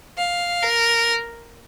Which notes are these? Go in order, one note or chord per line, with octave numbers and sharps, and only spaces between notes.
F5
A#4